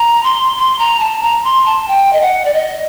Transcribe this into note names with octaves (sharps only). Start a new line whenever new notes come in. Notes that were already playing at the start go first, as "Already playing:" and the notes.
Already playing: A#5
C6
C6
A#5
A5
A#5
C6
A5
G5
D#5
F#5
D5
D#5